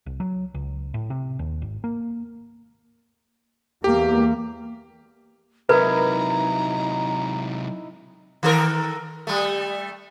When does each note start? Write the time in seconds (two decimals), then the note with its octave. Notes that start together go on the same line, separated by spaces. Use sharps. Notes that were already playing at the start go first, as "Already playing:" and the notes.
0.06 C2
0.20 F#3
0.54 C#2
0.94 A2
1.10 C3
1.39 D#2
1.62 G#1
1.84 A#3
3.84 E2 A#3 G4
5.69 C3 F#3 D#4 E4 A#4 B4 A#5
8.43 D#3 A4 A#4
9.27 G3 A3